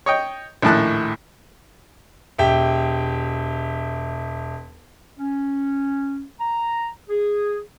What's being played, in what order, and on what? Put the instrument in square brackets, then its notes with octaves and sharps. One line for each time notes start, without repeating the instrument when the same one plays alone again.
[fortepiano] C#5 D#5 G5
A#1 D#2 A2 A5 F#6
[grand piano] E1 G4 E5 G5
[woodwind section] C#4
A#5
G#4